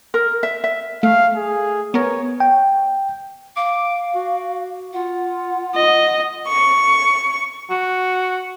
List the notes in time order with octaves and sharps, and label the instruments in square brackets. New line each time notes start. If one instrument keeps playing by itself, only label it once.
[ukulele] A#4
E5
E5
[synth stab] A3 [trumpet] F5
[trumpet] G#4
[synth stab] B3 A#4 [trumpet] C#5
[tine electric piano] G5
[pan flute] F5 [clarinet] D6
[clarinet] F#4
[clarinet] F4 [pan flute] F#5
[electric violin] D#5
[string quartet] C#6
[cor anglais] F#4